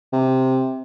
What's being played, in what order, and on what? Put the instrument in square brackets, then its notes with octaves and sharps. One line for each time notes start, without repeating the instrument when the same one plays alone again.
[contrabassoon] C3